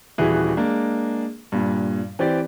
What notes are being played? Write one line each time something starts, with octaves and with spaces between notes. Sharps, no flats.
D#1 E3 F#4 G#4 E5
G#3 A#3 D4
G2 A#2
E3 C4 G4 D5